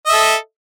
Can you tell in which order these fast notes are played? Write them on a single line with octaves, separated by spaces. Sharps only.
D#5 E5 A4